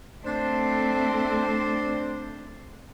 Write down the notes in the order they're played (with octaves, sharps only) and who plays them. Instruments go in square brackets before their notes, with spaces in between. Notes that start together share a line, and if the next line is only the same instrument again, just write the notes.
[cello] A3 C4 [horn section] D4 C5